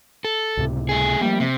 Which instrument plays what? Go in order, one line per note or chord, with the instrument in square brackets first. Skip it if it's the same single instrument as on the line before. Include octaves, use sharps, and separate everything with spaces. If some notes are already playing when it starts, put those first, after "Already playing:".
[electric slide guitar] A4
[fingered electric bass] C#2 A2 C3
[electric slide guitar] A3 G#4
[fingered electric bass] F3 A3 A#3 [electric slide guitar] G3
[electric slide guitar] C3